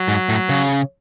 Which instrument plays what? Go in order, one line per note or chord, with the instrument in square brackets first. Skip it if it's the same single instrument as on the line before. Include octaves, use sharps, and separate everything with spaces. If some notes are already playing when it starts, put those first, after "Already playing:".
Already playing: [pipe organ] F#3
[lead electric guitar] G#2
A2
C#3